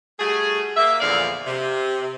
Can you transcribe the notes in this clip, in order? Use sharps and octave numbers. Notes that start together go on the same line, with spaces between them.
G3 A3 F#4 G#4
A#3 E5
E2 A#2 D3 F3 D5 F5
C3